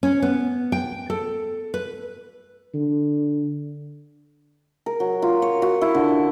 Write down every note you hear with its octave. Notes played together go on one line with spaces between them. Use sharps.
C#4
B3
G5
A4
B4
D3
A#4
F#3
F4
C#5
F#4
E4
D3